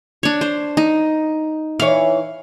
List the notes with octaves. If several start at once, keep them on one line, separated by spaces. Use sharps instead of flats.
D4 C#5
C5
D#4
E3 C#5 F5